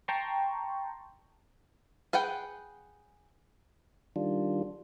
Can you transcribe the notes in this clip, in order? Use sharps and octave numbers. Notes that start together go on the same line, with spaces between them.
G5 A5 A#5 C6 C#6
G#4 B4 F#5 G5
D#3 G3 D4 F4